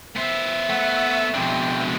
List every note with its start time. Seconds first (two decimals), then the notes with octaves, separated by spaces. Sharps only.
0.17 B3 C5 E5
0.69 A3 F#5
1.34 F2 B2 G#3 D4 G5